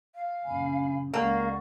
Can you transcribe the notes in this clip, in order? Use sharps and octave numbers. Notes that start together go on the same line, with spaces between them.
F5
A#1 F#2 C#3 G#5 B5
C#2 G#3 A#3 D5 F5 F#5 C#6